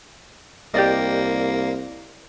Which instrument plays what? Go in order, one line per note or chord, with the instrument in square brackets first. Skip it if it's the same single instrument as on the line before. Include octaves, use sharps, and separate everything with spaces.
[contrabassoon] C2 [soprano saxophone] A#3 [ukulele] G4 D5 D#5